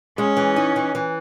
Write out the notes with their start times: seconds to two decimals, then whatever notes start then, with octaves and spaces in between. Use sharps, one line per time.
0.18 G#3 C#4
0.37 E3
0.56 D#4
0.76 E3
0.95 E3